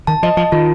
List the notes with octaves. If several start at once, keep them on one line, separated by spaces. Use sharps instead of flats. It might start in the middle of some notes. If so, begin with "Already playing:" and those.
D#3 A5
F3 D#5
F3 A5
D#3 F4